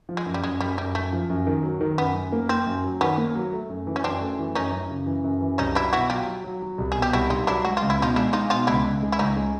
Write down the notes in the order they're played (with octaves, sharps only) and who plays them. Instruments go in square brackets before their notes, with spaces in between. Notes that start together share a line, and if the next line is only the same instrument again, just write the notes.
[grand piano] F3
[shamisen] G#3
[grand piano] F#2
[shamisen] G3
[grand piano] F#2 [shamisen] G#3
[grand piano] F#2 [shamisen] G3
[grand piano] F#2 [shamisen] G3
[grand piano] F#2 [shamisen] A3
[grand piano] F3
F#2
D#3
F#3
D#3
[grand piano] F#2 [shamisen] B3
[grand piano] F#2
A#3
[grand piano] A#3 [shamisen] C4
[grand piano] F#2
F#3
[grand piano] D#3 [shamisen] B3 C#4
[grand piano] A#3
F#3
A3
F#2
E3
[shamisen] C#4
[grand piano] F#2 [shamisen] C4 D4
[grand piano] A3
E3
[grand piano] F#2 [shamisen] C#4 D#4
[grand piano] F#2
C#3
E3
F#2
E3
[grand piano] C2 [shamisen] C#4 D#4
[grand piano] F#3 [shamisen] D4 E4
[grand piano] B2 [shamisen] E4 F#4
[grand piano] F#3 [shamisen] F4 G4
[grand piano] F#3
F#3
F#3
C2
[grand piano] B2 [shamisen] G#4
[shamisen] G4
[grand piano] C2 [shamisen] E4 F#4
[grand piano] C2 [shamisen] D#4 F4
[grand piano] F#3 [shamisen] D4 E4
[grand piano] G#3 [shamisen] F#4
[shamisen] F4
[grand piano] C#2
[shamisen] E4
[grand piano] B2 [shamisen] D#4 F4
[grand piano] G#3 [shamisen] D4 E4
[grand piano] G#3 [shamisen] D#4 F4
[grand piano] B2 [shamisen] D#4 F4
[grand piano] C#2 [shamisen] D4 E4
[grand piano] C#2
G#3
[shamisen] E4
[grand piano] C#2 [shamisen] C#4 D#4
[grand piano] G#3